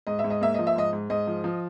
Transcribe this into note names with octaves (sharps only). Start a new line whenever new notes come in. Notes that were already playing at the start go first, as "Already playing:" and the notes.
G#2 D#5
E5
G#2
D#5
A#3 E5
F3 D#5
E5
G#2 D#5
G#2
G#2 D#5
F3
F3